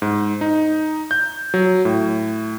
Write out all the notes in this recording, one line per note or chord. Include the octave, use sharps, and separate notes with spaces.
G#2
D#4
G6
F#3
A2